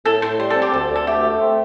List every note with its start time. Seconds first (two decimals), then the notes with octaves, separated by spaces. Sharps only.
0.05 A2 A4
0.22 A2 C5
0.39 G3 C5
0.50 A4
0.55 C4
0.62 G4
0.73 D2 A4
0.90 D2
0.96 A4
1.06 A3 G4
1.23 A3
1.41 C4